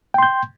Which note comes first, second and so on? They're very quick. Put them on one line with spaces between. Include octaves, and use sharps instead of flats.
G5 C6 G6